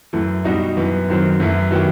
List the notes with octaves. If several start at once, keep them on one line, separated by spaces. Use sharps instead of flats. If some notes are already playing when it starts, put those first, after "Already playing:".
F#2 E3 A3 E4
B2 G3 D#4 F#4
F#2 E3 B3
F#2 D#3 F#3 C4
F#2 E3 A3 E4
D#3 F#3 B3 E4 G4